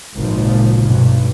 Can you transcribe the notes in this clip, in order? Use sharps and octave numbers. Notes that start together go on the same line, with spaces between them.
G#1 C#2 A#2 F3
B1 G2